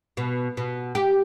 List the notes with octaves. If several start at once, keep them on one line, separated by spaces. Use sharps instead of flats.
B2
B2
G4